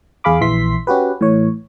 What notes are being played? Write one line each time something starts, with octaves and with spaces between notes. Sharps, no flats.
E2 G#4 F5 B5 D6
A#1 E3 E5 C6 B6
C#4 F#4 G4 B4
A2 E3 C#5